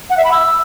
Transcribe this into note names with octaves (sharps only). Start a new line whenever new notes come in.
F#5
E5
B5
E6